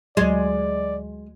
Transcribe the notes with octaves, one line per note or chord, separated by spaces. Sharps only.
D2 F#3 G#3 D5